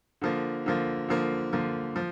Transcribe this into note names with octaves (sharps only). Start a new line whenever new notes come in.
D3 F3 A#3
D3 F3 A#3
D3 F3 A#3
D3 F3 A#3
F3